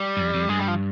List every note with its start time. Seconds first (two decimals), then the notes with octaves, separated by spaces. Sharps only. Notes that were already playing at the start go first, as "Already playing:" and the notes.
Already playing: G3
0.17 G2
0.20 F2
0.34 F2
0.49 G2 G#3
0.59 G3
0.68 F3